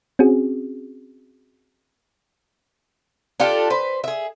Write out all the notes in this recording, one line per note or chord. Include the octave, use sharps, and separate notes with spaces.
C4 C#4 F#4 G#4
D4 F4 G4 A4
B4 C5
G#4 E5